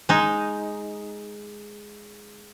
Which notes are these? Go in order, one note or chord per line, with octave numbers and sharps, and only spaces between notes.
G#3 D#4